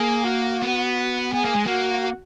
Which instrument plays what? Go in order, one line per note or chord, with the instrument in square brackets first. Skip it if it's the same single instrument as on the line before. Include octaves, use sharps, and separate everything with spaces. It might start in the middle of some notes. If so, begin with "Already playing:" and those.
Already playing: [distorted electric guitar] A#3 [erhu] G#4
[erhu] F#4
[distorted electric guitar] B3
[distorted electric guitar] B3 [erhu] G#4
[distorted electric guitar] A#3
G#3
[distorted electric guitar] A#3 [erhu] F#4